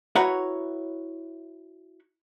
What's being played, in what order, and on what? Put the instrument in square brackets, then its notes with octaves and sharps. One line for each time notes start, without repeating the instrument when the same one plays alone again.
[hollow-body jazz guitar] E4 F#4 B4 C#5 F#5 A#5